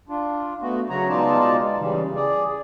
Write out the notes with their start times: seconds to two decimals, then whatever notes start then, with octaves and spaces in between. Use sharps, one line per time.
0.09 D4 F4
0.62 A3 B3 F#4
0.90 C#3 F#3 F#4 C#5 A#5
1.09 B2 G#3 D#4 F4 D5 A5
1.80 C#3 E3 G3
2.15 G#4 D5